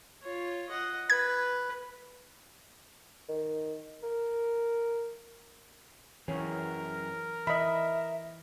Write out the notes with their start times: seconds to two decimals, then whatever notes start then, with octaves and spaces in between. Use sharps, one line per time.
0.23 F4 C#5
0.69 D#5 F#5
1.10 B4 G#6
3.29 D#3
4.03 A#4
6.28 F#2 E3 C#4 G#4 A#4 C#5
7.47 E3 D#5 E5 B5